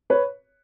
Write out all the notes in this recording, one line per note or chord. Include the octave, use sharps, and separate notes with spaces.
B4 C#5